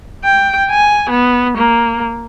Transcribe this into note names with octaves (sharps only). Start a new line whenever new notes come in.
G5
G#5
B3
A#3